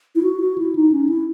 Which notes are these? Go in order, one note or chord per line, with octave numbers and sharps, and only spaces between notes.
E4
F#4
F#4
E4
D#4
C#4
E4